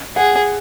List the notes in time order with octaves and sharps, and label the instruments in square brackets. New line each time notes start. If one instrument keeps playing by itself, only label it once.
[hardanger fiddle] G#4 [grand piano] F#5